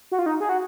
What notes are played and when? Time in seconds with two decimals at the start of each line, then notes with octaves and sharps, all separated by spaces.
0.12 F#4
0.19 F4
0.26 D#4
0.40 G#4
0.49 F#4